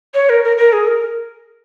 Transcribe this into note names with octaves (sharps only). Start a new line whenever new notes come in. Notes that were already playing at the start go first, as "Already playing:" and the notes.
C#5
A#4
A#4
A#4
G#4
A#4